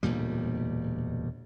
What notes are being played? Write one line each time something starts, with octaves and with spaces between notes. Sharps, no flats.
E1 D2 A#2 G3